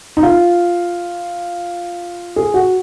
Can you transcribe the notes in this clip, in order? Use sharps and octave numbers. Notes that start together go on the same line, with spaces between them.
D#4
F4
G#4
F#4